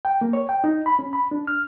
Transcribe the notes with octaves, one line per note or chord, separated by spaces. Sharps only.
G5
A#3
C#5
G5
D#4
B5
C#4
B5
D4
F6